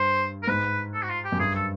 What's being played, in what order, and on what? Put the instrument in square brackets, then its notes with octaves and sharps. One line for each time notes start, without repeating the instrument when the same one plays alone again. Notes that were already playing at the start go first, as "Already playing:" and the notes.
Already playing: [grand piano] G2 [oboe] C5
[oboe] A#4
[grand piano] G#2 [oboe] B4
[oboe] A4
F#4
F4
G4
[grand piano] F#2
[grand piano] G2 [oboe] G#4
[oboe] A4